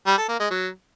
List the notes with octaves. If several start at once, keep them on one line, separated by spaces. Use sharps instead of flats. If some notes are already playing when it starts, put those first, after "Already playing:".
G3
A4
A#3
G#3
F#3